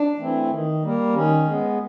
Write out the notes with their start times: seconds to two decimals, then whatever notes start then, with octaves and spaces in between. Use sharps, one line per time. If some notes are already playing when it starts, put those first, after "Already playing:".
Already playing: D4
0.19 E3 A3 C4
0.51 D#3
0.83 G3 A#3
1.14 D#3 C#4
1.47 G#3 B3